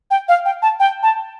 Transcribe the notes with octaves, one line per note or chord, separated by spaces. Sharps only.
G5
F5
G5
A5
G5
A5